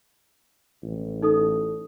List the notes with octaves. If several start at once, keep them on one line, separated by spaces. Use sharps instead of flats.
A1
D#4 A4 D#6